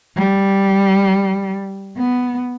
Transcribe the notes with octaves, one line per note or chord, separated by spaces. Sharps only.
G3
B3